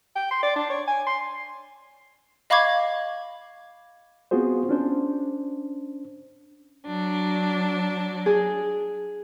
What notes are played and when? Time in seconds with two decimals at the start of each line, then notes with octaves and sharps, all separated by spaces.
0.16 G5
0.31 C6
0.43 D5
0.56 D4
0.70 C#5
0.88 G#5
1.07 C6
2.50 D#5 F5 B5 C#6 D6 G#6
4.31 B3 C4 F4 F#4 G#4 C5
4.69 C#4 D4 C5
6.87 F#3 D4
8.26 G#4